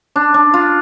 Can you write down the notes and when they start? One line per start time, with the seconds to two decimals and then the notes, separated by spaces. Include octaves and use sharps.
0.16 D4
0.34 D4
0.54 F4